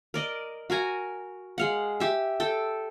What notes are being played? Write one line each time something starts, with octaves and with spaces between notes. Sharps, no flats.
A#4 D5 D#5
F#4 A#4 G#5 A#5
G#3 F5 F#5
G4 E5
A4 G5